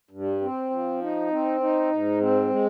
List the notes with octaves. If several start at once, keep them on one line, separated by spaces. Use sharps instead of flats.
G2
C4
F3
D#4
C4
D#4
G#2
C4
G#3